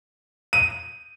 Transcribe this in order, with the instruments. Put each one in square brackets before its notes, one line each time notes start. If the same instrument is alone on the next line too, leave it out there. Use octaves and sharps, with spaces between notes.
[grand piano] D#7